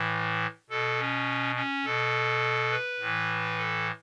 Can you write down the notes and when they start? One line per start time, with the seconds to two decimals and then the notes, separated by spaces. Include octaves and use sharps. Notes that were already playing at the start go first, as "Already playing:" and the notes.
Already playing: A2 E3
0.70 B2 A4
0.99 C#4
1.55 C#4
1.85 B2 A4
2.71 B4
2.99 A2 E3
3.57 A4